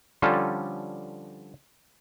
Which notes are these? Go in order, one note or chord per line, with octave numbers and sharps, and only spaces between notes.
D3 F3 G3 C#4 F4 A4